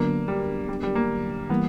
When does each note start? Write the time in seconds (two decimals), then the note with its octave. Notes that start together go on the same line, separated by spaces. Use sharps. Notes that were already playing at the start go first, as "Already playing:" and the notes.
Already playing: D3 F#3 A#3 B3 D4 A#4
0.28 G3
0.68 G3
0.83 G3
0.95 A#3
1.50 E3 G3 A#3 B3